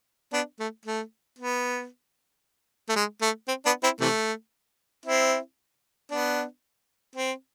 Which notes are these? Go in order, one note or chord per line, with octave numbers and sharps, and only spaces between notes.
B3 D4
A3
A3
B3
A3
G#3
A3
C4
B3 D4
C4 E4
C3 E3 A3
C4 E4
B3 D4
C4